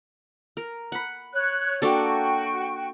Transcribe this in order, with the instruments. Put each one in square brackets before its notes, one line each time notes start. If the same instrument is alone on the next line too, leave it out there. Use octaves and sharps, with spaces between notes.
[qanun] A#4
F#5 B5
[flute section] C#5 F#6
[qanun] A#3 D4 A4 [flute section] F#4 G5 C#6